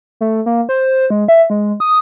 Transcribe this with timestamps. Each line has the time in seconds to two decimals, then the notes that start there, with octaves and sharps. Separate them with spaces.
0.21 A3
0.46 A#3
0.69 C5
1.10 G#3
1.28 E5
1.50 G#3
1.80 D#6